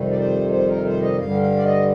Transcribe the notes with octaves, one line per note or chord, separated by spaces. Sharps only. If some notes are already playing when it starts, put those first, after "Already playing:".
Already playing: F2 C3 D#3 G3
D5
C5
C5
A#4
C5
D#5
G2 D3 G3 F5
F5
D5
D#5